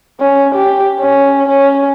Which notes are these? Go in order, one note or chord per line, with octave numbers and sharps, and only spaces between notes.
C#4
G4
C#4
C#4